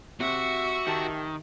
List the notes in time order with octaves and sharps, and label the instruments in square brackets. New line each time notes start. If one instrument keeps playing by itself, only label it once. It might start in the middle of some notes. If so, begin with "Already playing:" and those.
[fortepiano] C3 [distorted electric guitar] F#4 [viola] E5 C#6
[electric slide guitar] D#3 [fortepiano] G4 A5